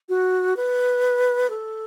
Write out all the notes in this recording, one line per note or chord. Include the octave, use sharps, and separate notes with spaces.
F#4
B4
A4